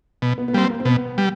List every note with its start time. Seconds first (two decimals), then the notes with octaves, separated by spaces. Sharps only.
0.22 B2
0.38 B3
0.48 B3
0.53 G3 A#3 C4
0.63 B3
0.70 A#3
0.80 C4
0.85 B2 B3
1.18 G3